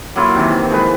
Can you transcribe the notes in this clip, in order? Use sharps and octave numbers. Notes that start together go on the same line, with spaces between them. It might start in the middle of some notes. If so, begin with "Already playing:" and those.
F#3 A#3 E4 F4
C3 D#3 E3
F3 G#3 B4